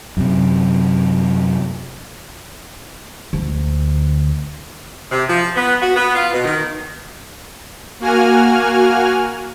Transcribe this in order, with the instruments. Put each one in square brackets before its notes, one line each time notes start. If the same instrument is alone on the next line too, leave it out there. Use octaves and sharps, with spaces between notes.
[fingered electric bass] F#2 C3
[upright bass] D2
[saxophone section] C3
F3
B3
F#4
B3
F4
B2
D#3
[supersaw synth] A#3 F#4 G#5 F6